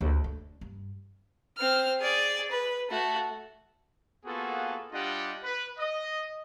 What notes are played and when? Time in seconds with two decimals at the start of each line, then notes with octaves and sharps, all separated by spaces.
0.01 D2
0.24 D4
0.61 G2
1.58 C4 F6
2.00 G#4 D5
2.51 B4
2.91 A3 F#4
4.25 A#3 B3 F4 F#4 G#4 A4
4.93 G3 D4 F4 G4 D#5 F#5
5.43 B4
5.79 D#5